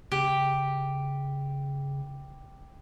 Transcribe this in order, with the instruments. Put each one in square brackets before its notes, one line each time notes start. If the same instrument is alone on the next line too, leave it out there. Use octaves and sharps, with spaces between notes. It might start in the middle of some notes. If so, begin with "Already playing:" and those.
[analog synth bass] C#3 [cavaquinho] G4